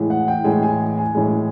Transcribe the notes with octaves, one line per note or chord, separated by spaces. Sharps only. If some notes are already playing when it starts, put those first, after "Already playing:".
Already playing: A2 E3 G#3
F#5
G5
A2 E3 G#3 G#5
G#5
G#5
A2 E3 G#3